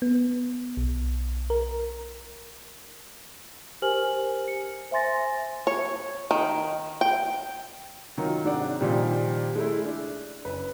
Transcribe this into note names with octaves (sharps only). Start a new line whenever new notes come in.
B3
B1
A#4
G4 A#4 C5 G#5 F6 F#7
C#7
C5 E5 G#5 C6 A6 A#6
C#5
D#3
G5
D#3 F#3 D#4 F4 A#4
G#2 C3 C4 D4 D5 F#5
A#2 D#3 F3 G3
G#3 A3 E4
D4
F#1 B4